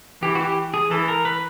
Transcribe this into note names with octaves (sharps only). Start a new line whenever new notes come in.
E3 G4
F#4
G4
G#4
E3 A4
A#4
B4